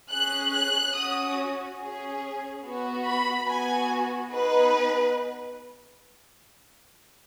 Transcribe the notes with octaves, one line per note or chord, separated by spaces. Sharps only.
C#4 G#4 F#6
F#6
C#4 F#4 D#6
C#4 G#4
B3 F#4
B5
B3 F#4 G#5
B3 D#4 G#4 B4